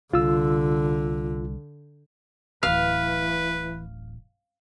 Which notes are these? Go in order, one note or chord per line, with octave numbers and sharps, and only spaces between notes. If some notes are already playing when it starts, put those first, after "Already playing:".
C2 D3 F4 E6
D1 A1 E3 B4 F5